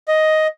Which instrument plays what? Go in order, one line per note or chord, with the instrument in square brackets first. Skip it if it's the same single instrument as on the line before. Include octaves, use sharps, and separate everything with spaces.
[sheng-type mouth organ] D#5